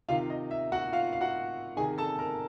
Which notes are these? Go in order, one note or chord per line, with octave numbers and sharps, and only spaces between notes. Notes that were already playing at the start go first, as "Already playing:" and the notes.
C3 D#3 F4 F5
D#5
E5
F#4 F#5
F4 F5
F5
F#4 F#5
C3 D#3 G#4 G#5
A4 A5
A#4 A#5